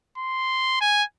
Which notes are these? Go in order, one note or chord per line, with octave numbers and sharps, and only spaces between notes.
C6
G#5